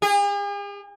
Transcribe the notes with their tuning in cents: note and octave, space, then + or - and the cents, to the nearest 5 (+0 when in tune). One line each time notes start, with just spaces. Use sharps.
G#4 -45